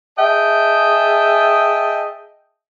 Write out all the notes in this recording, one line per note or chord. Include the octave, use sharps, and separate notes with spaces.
G#4 D#5 E5 G5 A5